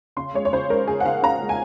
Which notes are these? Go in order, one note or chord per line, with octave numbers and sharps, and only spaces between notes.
C#3 C6
G#3 C#5
C#5
C#3 C5
G#3 A#4
C#3 G#4
F#5
C#3 F5
C#4 A#5
G#3
G#5